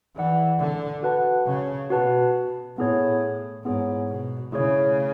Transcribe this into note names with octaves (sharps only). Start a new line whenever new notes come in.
E3 G#4 D5 F#5
D3
F#4 B4 F#5 A5
C#3
B2 F#4 B4 F#5 A5
A2 B3 E4 G#4 C#5
G#2 B3 E4 G#4 C#5
B2
C#3 A3 E4 G#4 C#5